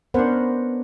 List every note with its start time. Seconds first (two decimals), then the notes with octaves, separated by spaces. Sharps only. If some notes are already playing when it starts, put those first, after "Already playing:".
0.14 B3 C#4 D4 A#4 C5 F#5